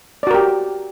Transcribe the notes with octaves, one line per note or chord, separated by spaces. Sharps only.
F#4 G4 A#4 D5